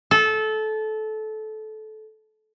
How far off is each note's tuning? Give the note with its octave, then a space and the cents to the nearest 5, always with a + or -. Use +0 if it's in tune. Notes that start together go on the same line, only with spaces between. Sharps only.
A4 -20